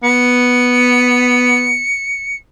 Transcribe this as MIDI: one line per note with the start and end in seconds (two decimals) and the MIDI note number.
0.02 1.81 59
0.02 2.36 97